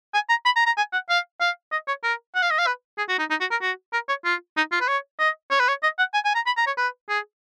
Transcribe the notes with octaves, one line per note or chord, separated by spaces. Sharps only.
G#5
A#5
B5
A#5
A#5
G#5
F#5
F5
F5
D#5
C#5
A#4
F#5
F5
D#5
F5
B4
G#4
F#4
D#4
D#4
F#4
A#4
F#4
A#4
C#5
F4
D#4
F4
B4
C#5
D#5
C#5
B4
C#5
D#5
F#5
G#5
G#5
A#5
B5
A#5
C#5
B4
G#4